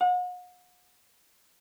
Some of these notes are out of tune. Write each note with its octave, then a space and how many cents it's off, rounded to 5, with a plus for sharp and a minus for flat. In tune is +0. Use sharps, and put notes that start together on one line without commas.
F#5 -40